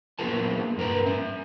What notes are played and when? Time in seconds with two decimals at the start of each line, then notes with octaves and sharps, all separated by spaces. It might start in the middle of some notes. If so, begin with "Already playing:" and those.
0.19 A#3 B3 F4 G#4 A#4 A5
0.78 G2 A#4 B4 A#5
1.06 C#4 E5